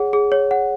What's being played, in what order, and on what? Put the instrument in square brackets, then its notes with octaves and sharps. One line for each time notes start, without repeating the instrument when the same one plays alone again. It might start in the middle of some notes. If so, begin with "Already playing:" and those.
Already playing: [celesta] G#4 C#5 F#5
G#4
C#5
F#5